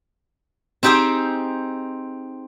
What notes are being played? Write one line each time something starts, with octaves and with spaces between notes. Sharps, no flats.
C4 D#4 G4 G#4 C5 G5